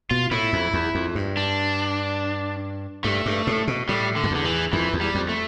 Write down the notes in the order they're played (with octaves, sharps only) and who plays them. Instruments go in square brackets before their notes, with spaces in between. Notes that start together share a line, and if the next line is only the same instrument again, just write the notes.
[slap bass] B2 [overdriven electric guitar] F4
[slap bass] A2 [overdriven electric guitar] E4
[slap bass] F2
E2
F2
G2
[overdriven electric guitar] D4
[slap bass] G2 [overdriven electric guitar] A3
[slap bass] G2
A2
B2
[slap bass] A2 [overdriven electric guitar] G3
[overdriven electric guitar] D3
[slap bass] F2
[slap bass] E2 [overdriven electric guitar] D3
[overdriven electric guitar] E3
[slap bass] F2 [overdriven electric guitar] E3
[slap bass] E2
[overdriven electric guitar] G3
[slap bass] F2
[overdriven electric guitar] A3